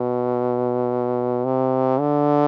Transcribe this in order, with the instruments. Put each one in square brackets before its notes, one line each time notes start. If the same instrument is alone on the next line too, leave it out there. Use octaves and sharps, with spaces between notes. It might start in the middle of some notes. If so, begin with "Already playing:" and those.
Already playing: [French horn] B2
C3
D3